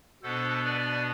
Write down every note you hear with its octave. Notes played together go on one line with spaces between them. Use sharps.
B2 B3 D4 A4 C5
B4 D5